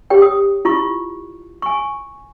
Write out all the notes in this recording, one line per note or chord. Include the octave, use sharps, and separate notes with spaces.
G4 C#5 G5
D#6
E4 F4 C#6
G#5 C#6